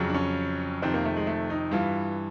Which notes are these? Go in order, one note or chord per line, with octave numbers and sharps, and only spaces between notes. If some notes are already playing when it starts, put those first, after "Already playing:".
Already playing: F2 C#3 F#3
D4
C#4
F2 C3 D#3 C4
A#3
A3
G#3
A3
D#4
G2 E3 F4